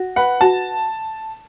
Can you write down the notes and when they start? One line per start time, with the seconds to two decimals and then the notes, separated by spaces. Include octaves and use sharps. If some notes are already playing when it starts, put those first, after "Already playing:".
Already playing: F#4
0.16 B4 F#5
0.41 F#4 A5